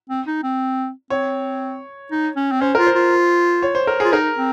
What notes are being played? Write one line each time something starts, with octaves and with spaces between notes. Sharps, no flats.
C4
D#4
C4
C4 C#5
D#4
C#4
C4
C#4 C5
F4 A#4
C5
F4
C#5
C5
A#4
F4 G#4
D#4 A#4
C4